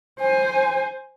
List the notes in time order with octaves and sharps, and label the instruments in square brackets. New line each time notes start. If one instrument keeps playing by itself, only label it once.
[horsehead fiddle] C5 G#5